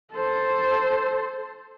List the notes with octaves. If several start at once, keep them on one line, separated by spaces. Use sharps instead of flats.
A4 C5